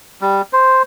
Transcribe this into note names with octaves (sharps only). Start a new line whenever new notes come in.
G3
C5